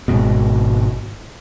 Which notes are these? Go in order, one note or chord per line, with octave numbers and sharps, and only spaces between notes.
G#1 G#2 B2